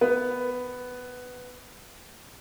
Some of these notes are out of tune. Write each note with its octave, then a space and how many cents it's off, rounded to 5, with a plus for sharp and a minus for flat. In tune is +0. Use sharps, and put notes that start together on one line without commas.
B3 +10